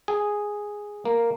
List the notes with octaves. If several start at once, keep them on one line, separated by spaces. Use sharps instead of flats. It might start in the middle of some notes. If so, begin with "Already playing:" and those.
G#4
A#3